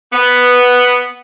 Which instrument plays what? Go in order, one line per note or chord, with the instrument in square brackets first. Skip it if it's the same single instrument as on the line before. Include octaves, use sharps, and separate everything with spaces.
[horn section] B3